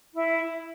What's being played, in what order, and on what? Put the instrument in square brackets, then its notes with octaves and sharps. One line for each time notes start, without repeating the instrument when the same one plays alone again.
[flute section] E4